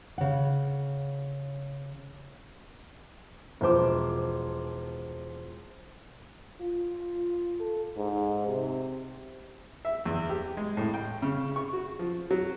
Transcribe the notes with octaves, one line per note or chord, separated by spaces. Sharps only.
C#3 F#5
E1 F3 C5 D6
F4
A4
G#2
C3
E5
E2
G4
G#3
A2
G5
C#3
C#6
F#4
F3
F#3